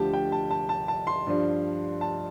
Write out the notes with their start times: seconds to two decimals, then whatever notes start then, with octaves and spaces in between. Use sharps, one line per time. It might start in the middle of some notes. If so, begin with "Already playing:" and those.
Already playing: D2 D3 F3 G4 A5
0.13 G5
0.32 A5
0.51 A5
0.69 A5
0.88 A5
1.07 C6
1.27 G2 F3 D4
2.01 A5